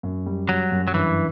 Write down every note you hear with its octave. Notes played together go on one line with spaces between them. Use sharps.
F#2
G3
F#3 G3
F#2
F#3
G2 E3